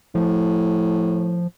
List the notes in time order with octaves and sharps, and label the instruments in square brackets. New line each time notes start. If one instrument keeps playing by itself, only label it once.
[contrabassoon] A2 [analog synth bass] F3